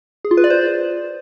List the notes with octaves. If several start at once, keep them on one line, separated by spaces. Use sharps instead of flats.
G#4
F4
B4
D5
C5